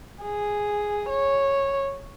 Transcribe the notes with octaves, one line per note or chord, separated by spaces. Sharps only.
G#4
C#5